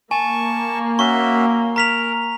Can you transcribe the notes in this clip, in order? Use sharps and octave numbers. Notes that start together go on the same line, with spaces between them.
A#3 G#5 A5 C#6
C#4 F#4 E5 C#6
A#4 A#5 B6 F7